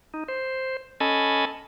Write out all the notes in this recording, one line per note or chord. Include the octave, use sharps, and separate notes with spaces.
D#4
C5
C#4 A4 D#5 G#5 A5 B5